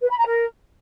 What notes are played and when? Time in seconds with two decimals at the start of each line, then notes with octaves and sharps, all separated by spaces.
0.02 B4
0.10 B5
0.18 A#5
0.26 A#4